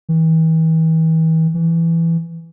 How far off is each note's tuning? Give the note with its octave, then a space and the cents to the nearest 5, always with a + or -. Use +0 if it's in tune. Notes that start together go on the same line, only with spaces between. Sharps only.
E3 -40
E3 +10